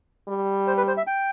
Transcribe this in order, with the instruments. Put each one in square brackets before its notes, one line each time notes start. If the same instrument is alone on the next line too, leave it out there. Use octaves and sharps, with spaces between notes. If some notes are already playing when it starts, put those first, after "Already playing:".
[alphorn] G3
[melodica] C5
B4
C5
E5
G5